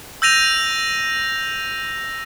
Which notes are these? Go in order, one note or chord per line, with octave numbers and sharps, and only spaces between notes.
E6 G6 A#6 D#7 F7